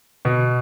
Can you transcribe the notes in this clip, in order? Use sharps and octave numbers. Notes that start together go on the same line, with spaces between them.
B2